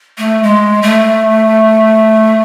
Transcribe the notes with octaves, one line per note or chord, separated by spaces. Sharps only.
A3
G#3
A3